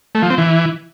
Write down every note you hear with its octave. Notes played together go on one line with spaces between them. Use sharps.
A3
F3
C4
E3